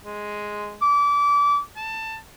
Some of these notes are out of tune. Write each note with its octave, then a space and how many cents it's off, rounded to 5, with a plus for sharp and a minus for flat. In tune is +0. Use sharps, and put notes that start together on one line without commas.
G#3 +0
D6 -25
A5 +15